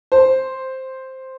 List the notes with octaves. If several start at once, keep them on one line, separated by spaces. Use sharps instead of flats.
C5